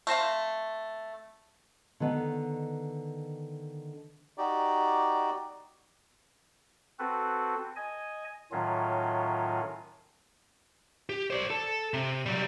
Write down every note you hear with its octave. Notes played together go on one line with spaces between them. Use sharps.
A3 C4 C5 F5
D3 D#3 B3
D#4 F#4 G4 D5
C4 F#4 A4 B4
D#5 G#5
A2 D#3 F#3 C#4 F4
G4
C5 D5
A4
C3
F#3 G3